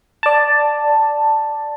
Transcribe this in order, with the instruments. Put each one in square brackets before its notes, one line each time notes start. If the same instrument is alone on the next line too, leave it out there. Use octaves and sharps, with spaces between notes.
[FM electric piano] D5 A5